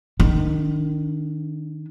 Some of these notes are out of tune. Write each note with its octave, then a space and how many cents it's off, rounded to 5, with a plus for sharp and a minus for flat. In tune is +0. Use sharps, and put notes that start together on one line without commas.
D#3 -15 D4 -45